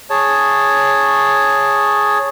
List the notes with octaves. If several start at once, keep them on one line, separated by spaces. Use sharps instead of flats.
G#4 C#5 A5